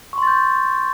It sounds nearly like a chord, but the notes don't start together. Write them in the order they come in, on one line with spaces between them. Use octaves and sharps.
C#6 C6 A6 G6